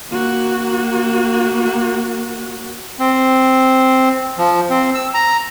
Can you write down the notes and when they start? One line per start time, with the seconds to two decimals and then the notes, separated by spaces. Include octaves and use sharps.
0.10 A#3 F#4
2.99 C4
4.38 F3
4.70 C4
4.94 E6
5.14 A#5